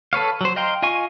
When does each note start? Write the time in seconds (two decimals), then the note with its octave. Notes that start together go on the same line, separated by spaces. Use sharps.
0.13 A4 B4 C#5 F5
0.41 F#3 C5
0.56 D#5 F5 G5 A#5 C6
0.82 F4 D#5 F5 G#5 C#6